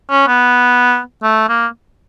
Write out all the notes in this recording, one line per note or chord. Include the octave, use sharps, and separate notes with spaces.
C#4
B3
A3
A#3